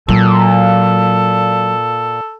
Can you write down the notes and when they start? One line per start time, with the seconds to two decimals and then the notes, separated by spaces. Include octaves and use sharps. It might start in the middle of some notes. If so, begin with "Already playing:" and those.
0.09 A#2 F#3 A4